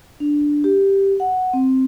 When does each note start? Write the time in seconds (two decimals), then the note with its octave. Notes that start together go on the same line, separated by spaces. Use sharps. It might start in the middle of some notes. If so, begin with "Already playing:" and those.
0.20 D4
0.64 G4
1.20 F#5
1.53 C4